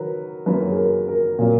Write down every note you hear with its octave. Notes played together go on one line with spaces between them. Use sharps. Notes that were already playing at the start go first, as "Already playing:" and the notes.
Already playing: D#3 F#3 A#4 B4
F#2 D#3 F#3 A#3 B4
G#4
A#4
A#4
A#2 F#3 A#3